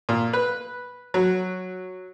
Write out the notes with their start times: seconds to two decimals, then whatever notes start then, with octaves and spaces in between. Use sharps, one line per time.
0.09 A#2
0.33 B4
1.14 F#3